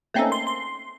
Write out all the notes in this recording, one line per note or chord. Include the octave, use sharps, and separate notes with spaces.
A3 A#3 C4 C#4 D#4 A4
C6
C6